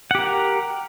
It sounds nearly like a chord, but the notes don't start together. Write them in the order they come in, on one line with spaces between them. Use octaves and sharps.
F#5 G4 A#4